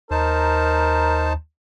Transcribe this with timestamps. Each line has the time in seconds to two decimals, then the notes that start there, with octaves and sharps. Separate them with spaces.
0.11 D#2 D#4 A#4 C5 A5